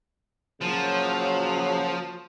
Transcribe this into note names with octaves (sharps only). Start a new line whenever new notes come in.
A#2 C#3 F3 F#3